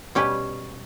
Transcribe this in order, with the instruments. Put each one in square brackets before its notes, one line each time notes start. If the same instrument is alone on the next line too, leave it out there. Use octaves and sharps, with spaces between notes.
[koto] B2 G3 C#4 G4 B4